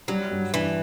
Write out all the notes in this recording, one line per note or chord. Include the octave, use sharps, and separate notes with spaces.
F#3 G3
G2
E3 D4